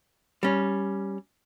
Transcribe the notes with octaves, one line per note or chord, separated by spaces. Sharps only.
G3 C#4